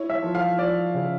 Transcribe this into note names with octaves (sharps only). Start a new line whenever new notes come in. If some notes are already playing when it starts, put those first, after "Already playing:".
Already playing: E4 C#5
E5
F3
F5
F3 D5
C#3